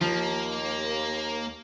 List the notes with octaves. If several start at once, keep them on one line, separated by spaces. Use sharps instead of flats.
D#2 F3 A#3